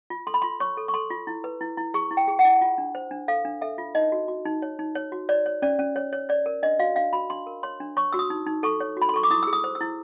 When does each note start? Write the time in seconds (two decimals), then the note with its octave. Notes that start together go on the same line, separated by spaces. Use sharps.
0.10 F4
0.27 A4 C6
0.34 B5
0.42 F4 C6
0.60 C#5 C#6
0.77 A4
0.88 C#6
0.94 A4 C6
1.10 F4
1.27 E4
1.44 B4
1.61 E4
1.77 E4
1.94 G#4 C#6
2.11 E4
2.17 G5
2.28 G#4
2.39 F#5
2.45 E4
2.61 F4
2.78 D4
2.95 C5
3.11 D4
3.28 A4 F5
3.45 D4
3.61 A4 E5
3.78 F4
3.95 D#4 D#5
4.12 F#4
4.28 F#4
4.45 D#4
4.62 C#5
4.79 D#4
4.95 C#5
5.12 F#4
5.29 C#5 D5
5.46 C#5
5.62 C#4 D5
5.79 C#4
5.96 C#5
6.13 C#5
6.29 C#5 D5
6.46 A#4
6.63 D4 D#5
6.79 F#4 F5
6.96 D4 F5
7.13 F#4 B5
7.30 D4 C6
7.47 A#4
7.63 C#5 C6
7.80 D4
7.97 C#5 C#6
8.13 F#4 E6
8.19 D#6
8.30 D#4
8.47 D#4
8.63 A4 C#6
8.80 C#5
8.97 F#4 B5
9.09 C6
9.14 A4 C#6
9.23 D6
9.31 E4 D#6
9.43 G#4 E6
9.53 D#6
9.64 C5
9.75 E6
9.81 E4